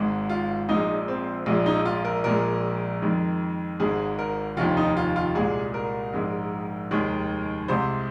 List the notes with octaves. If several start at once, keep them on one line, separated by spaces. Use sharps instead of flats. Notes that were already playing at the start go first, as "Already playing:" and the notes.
Already playing: G#1 G#2 G#3
F4
A#1 A#2 F3 G#3 D#4
C4
A#1 A#2 F3 G#3
D#4
F4
A#4
A#1 A#2 G#3 A#4
F2 D#3 G#3
G#1 G#2 G#3 G#4
A#4
F1 D#2 D#3 F4
D#4
F4
F4
C2 A#2 G#3 G#4
A#4
A#1 G#2 G#3
F1 D#2 D#3 G#3
C2 C3 G#3 C5